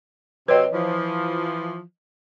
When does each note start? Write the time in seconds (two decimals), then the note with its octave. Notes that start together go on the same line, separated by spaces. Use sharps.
0.48 C3 F#3 C4 B4 C#5 D#5
0.73 E3 F3